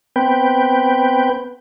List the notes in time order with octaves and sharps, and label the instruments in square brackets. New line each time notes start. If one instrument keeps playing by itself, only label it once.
[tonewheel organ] B3 C4 B4 G5